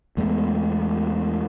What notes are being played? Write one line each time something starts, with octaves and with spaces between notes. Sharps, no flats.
E2 G#3 A3 B3